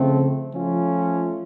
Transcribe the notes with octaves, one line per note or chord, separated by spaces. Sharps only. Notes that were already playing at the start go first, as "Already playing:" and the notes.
Already playing: C#3 F3 A3 C4
F3 A3 C#4 F4